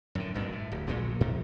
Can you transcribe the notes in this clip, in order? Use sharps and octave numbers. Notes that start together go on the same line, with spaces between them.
F#2 A2 D3
G#1 G2 B2 D#3
A2
D1
A#1 A#2 F#3 G#3
F2 C3